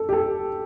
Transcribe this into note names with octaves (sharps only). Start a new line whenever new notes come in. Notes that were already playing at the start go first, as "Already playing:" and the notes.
Already playing: A4
G4
A4